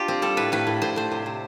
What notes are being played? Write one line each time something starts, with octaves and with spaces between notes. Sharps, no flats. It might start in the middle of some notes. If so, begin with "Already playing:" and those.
Already playing: D4 F4 G4
C4
G3 A4
A2 B4
A2 B4
A2
A2 C5
A2 C5
C3
C3